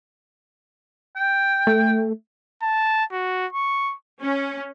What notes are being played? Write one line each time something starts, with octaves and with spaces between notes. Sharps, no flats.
G5
A3
A5
F#4
C#6
C#4